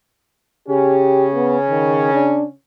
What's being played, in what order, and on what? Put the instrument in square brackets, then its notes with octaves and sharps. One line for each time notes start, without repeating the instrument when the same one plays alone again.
[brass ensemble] C#3 C#4 [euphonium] G4
[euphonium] B3
D#3
D4